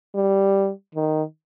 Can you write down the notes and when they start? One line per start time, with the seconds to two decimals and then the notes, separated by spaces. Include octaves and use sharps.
0.15 G3
0.95 D#3